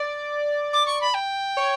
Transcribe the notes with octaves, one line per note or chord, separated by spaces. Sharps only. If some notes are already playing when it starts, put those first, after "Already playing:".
Already playing: D5
D6
C#6
B5
G5
C#5